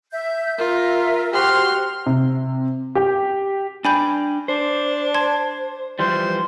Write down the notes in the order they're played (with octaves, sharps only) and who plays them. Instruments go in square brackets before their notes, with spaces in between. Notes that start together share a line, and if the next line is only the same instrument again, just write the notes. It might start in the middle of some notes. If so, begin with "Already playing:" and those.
[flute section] E5 G6
[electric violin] F4 [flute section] A#4 E5
[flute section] F#4 C5 [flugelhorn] G4 [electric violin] C6 F6
[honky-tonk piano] C3
G4
[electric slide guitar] D4 D5 G5 [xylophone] G#5 B5 G6
[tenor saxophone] D4 [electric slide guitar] C5
[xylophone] A5 C6 G#6
[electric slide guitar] E3 F3 G3 [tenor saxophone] C5